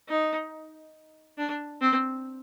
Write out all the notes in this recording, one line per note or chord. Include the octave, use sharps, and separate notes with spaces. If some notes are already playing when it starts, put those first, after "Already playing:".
D#4
D4
C4